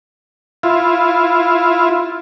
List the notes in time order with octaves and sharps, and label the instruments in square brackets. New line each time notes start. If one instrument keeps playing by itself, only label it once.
[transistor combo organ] E4 F4